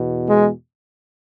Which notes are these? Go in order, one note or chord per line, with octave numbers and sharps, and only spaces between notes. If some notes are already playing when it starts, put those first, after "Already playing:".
Already playing: E2 B2
G#3